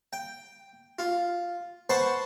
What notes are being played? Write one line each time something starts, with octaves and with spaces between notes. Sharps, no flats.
G5
F4
B4 C5 F#5 A5 C6 C#6